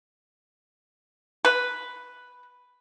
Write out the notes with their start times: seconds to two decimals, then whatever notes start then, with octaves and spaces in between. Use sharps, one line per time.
1.45 B4